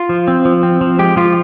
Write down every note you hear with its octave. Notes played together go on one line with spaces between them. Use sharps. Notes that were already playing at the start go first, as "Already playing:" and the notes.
Already playing: F4
F3
C4
F3
C4
F3
G#3 G4
F3 F4